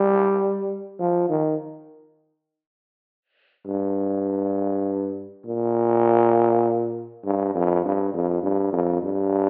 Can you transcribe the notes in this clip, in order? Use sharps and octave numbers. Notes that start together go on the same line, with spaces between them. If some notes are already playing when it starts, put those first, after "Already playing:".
Already playing: G3
F3
D#3
G2
A#2
G2
F2
G2
F2
G2
F2
G2